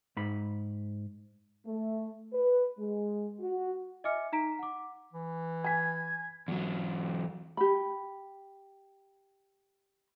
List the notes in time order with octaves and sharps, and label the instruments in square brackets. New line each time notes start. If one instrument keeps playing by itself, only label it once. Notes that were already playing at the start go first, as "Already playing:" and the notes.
[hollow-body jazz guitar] G#2 B5
[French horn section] A3
B4
G#3
F#4
[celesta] D#5 E5 G#5 D6 F6 C#7
D#4 A#5 B6 D7
F#5 D6
[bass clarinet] E3
[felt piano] G#5 B6 [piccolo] G#6
[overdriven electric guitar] E2 F#3
[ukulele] G4 B5